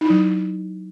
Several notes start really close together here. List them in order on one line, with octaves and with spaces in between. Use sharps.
D#4 E4 F#3